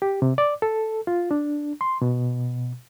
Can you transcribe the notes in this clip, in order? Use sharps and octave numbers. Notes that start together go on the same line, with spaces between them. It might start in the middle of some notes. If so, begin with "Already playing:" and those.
G4
C3
D5
A4
F4
D4
C6
B2